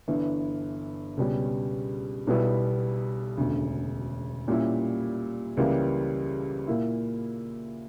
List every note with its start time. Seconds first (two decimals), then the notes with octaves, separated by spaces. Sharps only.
0.08 G1 G2 E3
1.17 C#2 B2 G3 C#4
2.27 B1 B2 G3 B3 E4
3.38 E1 D2 C#3
4.48 A#2 G3 C#4 E4
5.57 C#2 C#3 E3 G3 A#3
6.67 A#2 A#3 E4